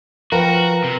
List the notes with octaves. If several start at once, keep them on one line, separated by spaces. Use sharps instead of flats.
F3 F#4 A#4 B4 F5 G5
C3